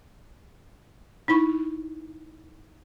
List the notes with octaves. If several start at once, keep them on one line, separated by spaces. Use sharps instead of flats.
D#4 E4 B5 C#6